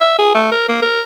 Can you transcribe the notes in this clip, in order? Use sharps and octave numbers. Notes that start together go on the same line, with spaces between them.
E5
G#4
A3
A#4
A#3
A#4